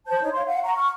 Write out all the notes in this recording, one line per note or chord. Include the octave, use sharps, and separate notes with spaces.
C5 A5 G6
D#4 C#5
C#5 F5 C6
F5 F#5
F#5 A#5 C#6
C#6 F6